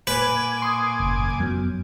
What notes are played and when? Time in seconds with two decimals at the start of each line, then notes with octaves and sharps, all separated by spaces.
0.07 A#2 B4 G#5 D6
0.62 C6 D#6
1.00 F#1
1.40 F#2 F#3 B3